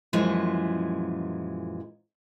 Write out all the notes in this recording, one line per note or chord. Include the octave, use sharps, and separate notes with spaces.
F#2 A#2 E3 F3 G#3